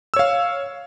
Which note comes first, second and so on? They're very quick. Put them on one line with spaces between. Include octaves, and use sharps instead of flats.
E6 C#5 F5